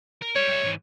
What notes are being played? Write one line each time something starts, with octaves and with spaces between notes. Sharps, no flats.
A#4
G3 C#5
G3 E5
G#2 E3